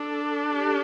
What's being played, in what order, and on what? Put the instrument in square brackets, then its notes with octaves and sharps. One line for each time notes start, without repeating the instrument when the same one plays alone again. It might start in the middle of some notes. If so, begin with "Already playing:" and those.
Already playing: [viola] D4 [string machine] A4
[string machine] G4